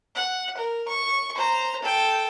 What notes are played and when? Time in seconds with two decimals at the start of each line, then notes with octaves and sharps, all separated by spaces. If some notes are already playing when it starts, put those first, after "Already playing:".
0.15 F#5
0.57 A#4
0.88 C#6
1.35 C5 A#5
1.82 A4 G5